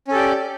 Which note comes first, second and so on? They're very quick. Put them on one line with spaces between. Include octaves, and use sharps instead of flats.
C#4 A4 G4 D5